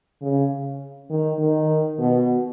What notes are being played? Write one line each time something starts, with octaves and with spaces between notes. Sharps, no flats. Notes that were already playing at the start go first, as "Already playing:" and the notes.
C#3
D#3
D#3
B2